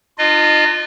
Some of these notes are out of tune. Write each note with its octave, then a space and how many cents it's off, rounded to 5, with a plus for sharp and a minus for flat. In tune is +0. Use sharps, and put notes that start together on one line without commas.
D4 +45 F4 +0 D#5 -20